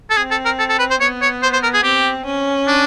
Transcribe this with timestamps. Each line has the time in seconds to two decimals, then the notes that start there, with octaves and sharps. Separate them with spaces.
0.10 A4
0.17 C4 G#4
0.31 A4
0.45 A#4
0.59 A4
0.70 A4
0.79 B4
0.90 C5
1.01 B3 C#5
1.22 C#5
1.43 C5
1.53 C5
1.63 A#4
1.74 G#4
1.84 C4 G4
2.26 C#4
2.68 D4